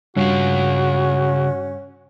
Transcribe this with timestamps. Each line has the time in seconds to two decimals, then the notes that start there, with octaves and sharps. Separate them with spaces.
0.17 G2 C#3 C#4 F4 F#4 F5